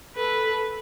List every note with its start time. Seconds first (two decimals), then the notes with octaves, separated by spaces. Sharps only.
0.16 A4 B4